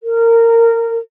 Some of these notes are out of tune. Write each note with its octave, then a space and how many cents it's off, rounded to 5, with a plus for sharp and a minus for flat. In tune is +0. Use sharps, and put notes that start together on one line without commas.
A#4 -20